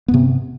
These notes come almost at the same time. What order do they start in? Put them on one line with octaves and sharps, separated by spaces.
B3 G2 C3